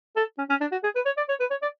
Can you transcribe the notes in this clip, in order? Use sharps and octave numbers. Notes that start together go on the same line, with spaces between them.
A4
C#4
C#4
D4
F#4
G#4
B4
C#5
D5
C#5
B4
C#5
D5